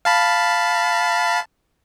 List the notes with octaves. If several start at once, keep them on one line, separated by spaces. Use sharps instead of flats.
F5 A5 B5